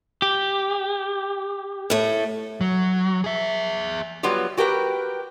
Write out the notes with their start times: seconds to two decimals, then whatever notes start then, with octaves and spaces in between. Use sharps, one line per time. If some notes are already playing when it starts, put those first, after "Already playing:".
0.22 G4
1.90 A2 A3
2.61 F#3
3.24 G#4 E5
4.23 F#3 G3 B3 F4 G4
4.57 F#4 G4 A#4 B4 G5